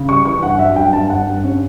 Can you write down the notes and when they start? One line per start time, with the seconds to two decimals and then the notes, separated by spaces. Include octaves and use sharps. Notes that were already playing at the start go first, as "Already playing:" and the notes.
Already playing: C#3
0.08 G3 C#6
0.25 E3 C#6
0.42 G2 F#5
0.55 F#5
0.59 F#3 E5
0.76 G2 G5
0.93 G2 A5
1.10 G2 F#5
1.27 G2
1.44 C#4